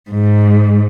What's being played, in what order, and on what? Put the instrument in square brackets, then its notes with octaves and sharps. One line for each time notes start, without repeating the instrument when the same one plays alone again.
[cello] G#2